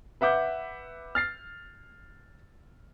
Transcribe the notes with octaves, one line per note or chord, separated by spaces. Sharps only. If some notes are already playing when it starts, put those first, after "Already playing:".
B4 E5 F#5 D6 G6
F6 A6 C7